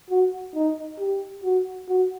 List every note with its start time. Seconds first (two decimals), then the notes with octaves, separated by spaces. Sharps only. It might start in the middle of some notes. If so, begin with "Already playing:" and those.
0.10 F#4
0.55 D#4
0.99 G4
1.44 F#4
1.89 F#4